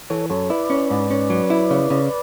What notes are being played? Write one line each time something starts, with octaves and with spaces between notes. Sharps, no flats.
E3 A4 C#5
F#2 A4 C#5
E4 B4 D5
C#4
G#2
C#4
F#3
E4
C#3
C#3